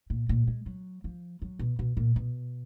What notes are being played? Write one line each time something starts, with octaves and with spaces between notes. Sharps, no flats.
A#2
A#2
G#3
F#3
F3
F#3
B2
B2
A#2
B2